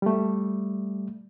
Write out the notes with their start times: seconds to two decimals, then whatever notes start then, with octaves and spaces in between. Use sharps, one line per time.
0.02 G3 A3